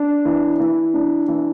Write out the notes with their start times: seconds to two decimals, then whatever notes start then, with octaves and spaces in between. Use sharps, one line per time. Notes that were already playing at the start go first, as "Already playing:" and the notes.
Already playing: D4
0.25 E3
0.60 E3
0.94 D4
1.28 E3